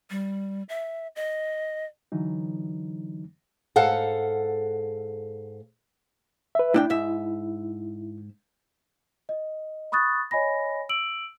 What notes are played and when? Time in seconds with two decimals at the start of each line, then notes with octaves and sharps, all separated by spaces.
0.11 G3
0.69 E5
1.16 D#5
2.12 D3 E3 F#3 D#4
3.76 G#2 A4 F5 F#5
6.55 B4 E5
6.74 A2 D4 E4 G5
6.90 G#2 E5
9.29 D#5
9.92 B5 C#6 D#6 F#6 A6
10.31 C#5 D#5 G#5 B5 A#6
10.89 E6 D7 F#7